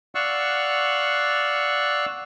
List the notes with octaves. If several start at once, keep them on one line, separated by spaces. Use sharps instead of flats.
D5 F5 F#5 C#6 E6 F#6